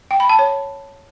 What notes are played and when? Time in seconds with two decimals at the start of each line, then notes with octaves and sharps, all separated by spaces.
0.11 G5
0.20 B5
0.29 A5
0.39 C#5